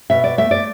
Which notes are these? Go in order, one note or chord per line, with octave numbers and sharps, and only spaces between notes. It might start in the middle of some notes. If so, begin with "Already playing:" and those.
B2 E5
D5
A3 E5
D5